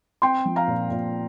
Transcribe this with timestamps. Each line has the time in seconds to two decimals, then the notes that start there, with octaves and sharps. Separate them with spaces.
0.22 C4 G5 C6
0.45 F3
0.56 F5 A#5
0.68 A#2
0.90 A#2